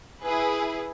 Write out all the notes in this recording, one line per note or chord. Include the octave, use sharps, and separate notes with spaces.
E4 G#4 B4